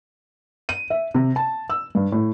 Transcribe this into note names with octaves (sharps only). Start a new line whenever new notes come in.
D#7
E5
C3
A5
E6
G2
A2